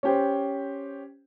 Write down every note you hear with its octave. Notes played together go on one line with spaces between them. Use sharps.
C#4 G4 C5